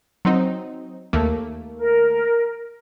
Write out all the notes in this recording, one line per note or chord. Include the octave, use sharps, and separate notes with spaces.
F#3 C4 D#4
D#2 A3 A#3
A#4